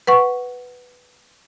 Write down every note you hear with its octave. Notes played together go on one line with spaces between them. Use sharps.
B4 F#5 C#6